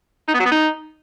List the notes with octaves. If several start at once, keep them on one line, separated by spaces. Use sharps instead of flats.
D#4
B3
F#3
B3
D#4